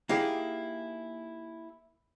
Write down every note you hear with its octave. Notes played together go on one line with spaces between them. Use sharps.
A#3 D#4 E4 G4 G#4